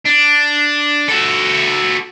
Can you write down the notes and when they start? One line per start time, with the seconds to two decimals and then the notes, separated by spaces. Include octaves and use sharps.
0.06 D4
1.08 F#4 A4